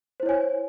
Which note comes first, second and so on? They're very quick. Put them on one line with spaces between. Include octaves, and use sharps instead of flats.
C5 E4 C#5 G#5